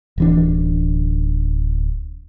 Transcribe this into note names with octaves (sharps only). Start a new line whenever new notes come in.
D1 E3 D4